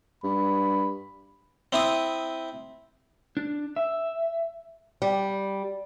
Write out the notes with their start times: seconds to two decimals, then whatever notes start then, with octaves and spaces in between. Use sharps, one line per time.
0.24 G2 B5
1.73 C4 E4 D#6
3.37 D4
3.76 E5
5.02 G3